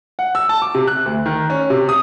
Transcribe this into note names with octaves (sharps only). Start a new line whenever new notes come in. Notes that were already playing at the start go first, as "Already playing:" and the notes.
F#5
E6
A5
D6
C3
F#6
D2
D#3
C#4
C3
D#6